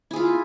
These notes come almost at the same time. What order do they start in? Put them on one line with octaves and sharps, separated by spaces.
E4 G#4 F4